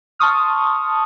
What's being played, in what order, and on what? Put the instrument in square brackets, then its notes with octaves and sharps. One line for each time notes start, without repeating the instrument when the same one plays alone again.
[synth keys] A5 C6 C#6 D#6 F6